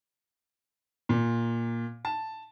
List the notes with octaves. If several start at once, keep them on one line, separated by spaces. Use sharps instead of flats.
A#2
A5